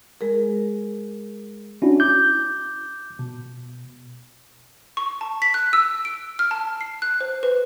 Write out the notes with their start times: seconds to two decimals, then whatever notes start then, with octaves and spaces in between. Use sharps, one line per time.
0.21 G#3 G#4 A#4
1.82 C#4 D4 E4 F#4
2.00 D6 G6
3.19 B2
4.97 C#6
5.21 A5
5.42 B6
5.54 F#6
5.73 E6
6.05 D7
6.39 F6
6.51 A5
6.81 C7
7.02 F#6
7.21 C5
7.43 B4